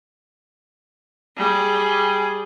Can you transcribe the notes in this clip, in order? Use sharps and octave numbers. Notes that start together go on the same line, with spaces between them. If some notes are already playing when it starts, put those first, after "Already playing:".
G3 G#4